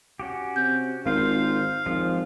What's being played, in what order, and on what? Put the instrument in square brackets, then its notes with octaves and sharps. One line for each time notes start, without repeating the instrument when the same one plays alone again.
[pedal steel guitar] C#4 F#4 G4
[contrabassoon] C3 [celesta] G6
[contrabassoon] G#1 [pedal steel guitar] D#3 F4 C5 [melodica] F5
[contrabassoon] G#1 [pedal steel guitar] F3 G#3 F4